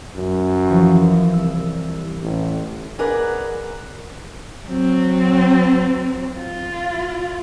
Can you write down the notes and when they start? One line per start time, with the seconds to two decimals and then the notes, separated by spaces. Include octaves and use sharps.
0.16 F#2
0.67 E3 F3 C#6
1.33 C2 E6
2.23 A1
2.99 G#4 A#4 B4 D5 F#5
4.66 F#3 C4
6.38 F4